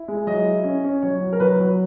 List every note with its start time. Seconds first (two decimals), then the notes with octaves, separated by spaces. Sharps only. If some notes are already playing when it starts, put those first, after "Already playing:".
Already playing: E4
0.08 G#3
0.27 F#3 D#5
0.45 E4
0.64 C#4
0.84 C#4
1.02 F#3 C#5
1.21 F#3
1.33 A#4
1.40 F#3 B4
1.60 F#3